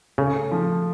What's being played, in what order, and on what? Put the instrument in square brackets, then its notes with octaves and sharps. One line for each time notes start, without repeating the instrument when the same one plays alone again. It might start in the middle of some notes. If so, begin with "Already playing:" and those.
[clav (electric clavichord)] C#3 [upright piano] A3
[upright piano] F3